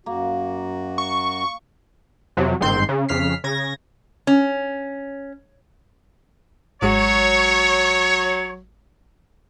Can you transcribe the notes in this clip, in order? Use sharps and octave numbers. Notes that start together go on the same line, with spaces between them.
F#2 A#3 F#4
C#6
F2 C3 F#3
G1 G#2 D#3 C4 C6 G6
C#3
F2 C#3 F6 B6 C7
C#3 G#6 A#6
C#4
G#1 F#3 G#3 F#4 C#5